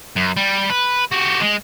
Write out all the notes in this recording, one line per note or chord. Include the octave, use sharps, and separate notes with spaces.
F#2
G3
B4
F#4 G4
G#3